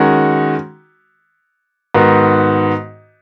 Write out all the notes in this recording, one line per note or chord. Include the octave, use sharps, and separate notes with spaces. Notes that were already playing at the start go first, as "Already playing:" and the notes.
Already playing: D#3 G#3 C#4 F#4
G#2 D#3 B3 F#4